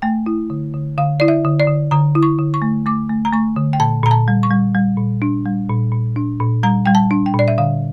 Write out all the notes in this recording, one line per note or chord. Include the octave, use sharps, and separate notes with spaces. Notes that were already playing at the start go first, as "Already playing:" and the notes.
A3 G5
E4
D3
D3
D3 F5
E4 D5
E5
D3
D5
D3
D3 A#5
E4
C#6
D3
C#6
A3
A3 D6
A3
A#5
A3 C#6
D3
G5
A#2 A5
A#2 A#5
A5
G3
C#6
G3
G3
A#2
D4
G3
A#2
A#2
D4
A#2
G3 A#5
G3 G5
A5
D4
G5
A#2 D5
E5
D3 F5